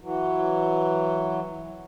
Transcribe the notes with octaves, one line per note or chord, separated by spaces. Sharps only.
E3 F#3